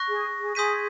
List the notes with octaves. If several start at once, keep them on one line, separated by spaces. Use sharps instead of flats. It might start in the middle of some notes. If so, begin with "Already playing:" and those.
Already playing: C#6 F#6 A#6
G#4
G#4
G#4 C6 D#6 G6 B6 D#7